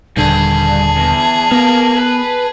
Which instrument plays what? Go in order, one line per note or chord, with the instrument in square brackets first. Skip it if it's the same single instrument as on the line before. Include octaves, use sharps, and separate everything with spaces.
[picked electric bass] D#1 D3 [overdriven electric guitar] G2 [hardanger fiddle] G#4 [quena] A5
[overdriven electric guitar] E2
[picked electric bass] B3 [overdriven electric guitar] A#4 F5
[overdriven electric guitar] B4